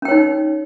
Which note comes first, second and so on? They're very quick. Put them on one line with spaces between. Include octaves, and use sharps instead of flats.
C#4 G5 C#5 D#4